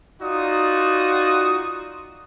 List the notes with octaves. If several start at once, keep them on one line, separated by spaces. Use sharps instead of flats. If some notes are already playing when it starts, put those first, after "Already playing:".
D#4 F4 F#4 D5 D#6